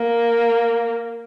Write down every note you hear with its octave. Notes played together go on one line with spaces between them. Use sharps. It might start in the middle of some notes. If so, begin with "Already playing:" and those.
Already playing: A#3